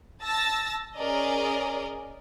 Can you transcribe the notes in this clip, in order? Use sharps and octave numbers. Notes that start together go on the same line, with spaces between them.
A5 E6 A6 A#6
C#4 G#4 A#4 D5 D#5